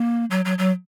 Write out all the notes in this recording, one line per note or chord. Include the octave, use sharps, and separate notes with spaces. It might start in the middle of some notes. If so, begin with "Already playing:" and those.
Already playing: A#3
F#3
F#3
F#3